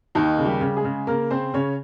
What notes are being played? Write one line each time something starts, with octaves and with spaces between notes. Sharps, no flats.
D#2 D#3 D#4
C#3
G3 G4
C#3
G#3 G#4
C#3
C#3 A#3 A#4
C#3 C4 C5
C#3 C#4 C#5